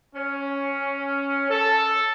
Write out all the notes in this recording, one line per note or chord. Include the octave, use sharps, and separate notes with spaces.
C#4
A4